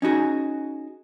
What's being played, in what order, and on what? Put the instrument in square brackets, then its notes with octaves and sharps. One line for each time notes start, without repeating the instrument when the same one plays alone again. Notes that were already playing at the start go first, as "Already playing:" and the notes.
[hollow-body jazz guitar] C#4 D#4 F#4 G#4